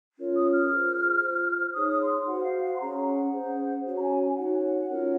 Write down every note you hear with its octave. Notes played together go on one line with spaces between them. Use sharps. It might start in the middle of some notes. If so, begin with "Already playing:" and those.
C#4 F4 A#4 C#5
D#6
F6
F4 G#4 C5
F4 C5
D#4 G#4 C#5 D#6
D#6
C6
F#4 C5 F#5
F5
F#5
C6
C#4 G#4 C#5 A#5
F#5
C#4 G#4 C5
C#4 F#4 C#5
A#5
G#5
G#5
D#4 F#4 C#5 F#5
C#4 F4 A#4 C#5